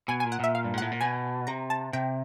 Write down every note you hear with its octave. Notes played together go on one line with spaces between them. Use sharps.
B2 G#5
A#2 G#5
F#5
A#2 E5
F5
G2
G#2
A2 F#5
A#2
B2 G#5
C3 A#5
A5
C3 G5